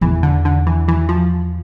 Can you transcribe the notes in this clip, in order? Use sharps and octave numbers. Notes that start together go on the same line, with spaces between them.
E2 E3
D3
D3
E3
E3
F3